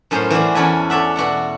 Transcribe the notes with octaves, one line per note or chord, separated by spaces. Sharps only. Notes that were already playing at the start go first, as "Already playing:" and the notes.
F#2 A2 C#4 A#4 C5 C6
E3 F#4 G#4 D5
E2 C#4 A4 G#5 B5
A4 C#5 D5 E5 F#5
B2 F#4 D5 F#5